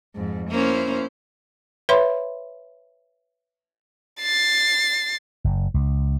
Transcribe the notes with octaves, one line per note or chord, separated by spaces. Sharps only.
F2 G#2
A#3 C#4 E4 C5
B4 C#5 E5 B5 C6
A6 C7
F#1
C#2